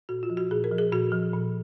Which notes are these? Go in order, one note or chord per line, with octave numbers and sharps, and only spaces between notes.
A#2 F#4
F4
F3
F#4
A#2 G#4
A#4
F3
G#4
A#2 F#4
F3
A#2